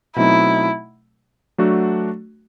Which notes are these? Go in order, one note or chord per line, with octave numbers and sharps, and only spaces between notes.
B2 F#3 A3 C4 D#4 E4
F#3 A3 D4 F#4